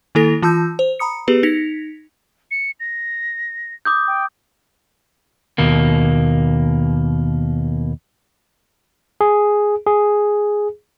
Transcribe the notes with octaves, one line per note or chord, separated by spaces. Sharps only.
D#3 A#3 E4 A4 A#6 F7
E3 F4 A5 E6 G6
C5
A#5 B5 D#6 C#7
B3 G4 G#4 B4
D#4 A#6 B6 C#7 F7
C#7
A#6
D6 D#6 G6
G5
D#2 B2 A#3
G#4
G#4